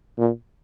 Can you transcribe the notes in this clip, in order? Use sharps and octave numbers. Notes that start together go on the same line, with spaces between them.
A#2